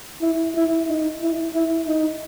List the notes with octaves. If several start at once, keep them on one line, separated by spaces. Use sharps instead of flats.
E4
E4
D#4
E4
E4
D#4